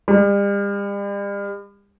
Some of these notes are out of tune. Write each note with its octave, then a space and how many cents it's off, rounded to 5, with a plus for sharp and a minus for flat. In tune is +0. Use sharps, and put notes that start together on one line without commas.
G3 +40